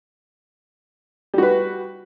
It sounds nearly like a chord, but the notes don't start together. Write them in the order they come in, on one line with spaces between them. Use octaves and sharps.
G3 F#4 B4